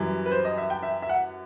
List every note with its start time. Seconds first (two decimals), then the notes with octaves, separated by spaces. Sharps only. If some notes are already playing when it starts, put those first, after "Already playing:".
Already playing: F#2 E3 G3
0.26 B4
0.31 C5
0.45 D#5
0.58 E5
0.70 G5
0.83 E5
1.02 E5
1.09 F#5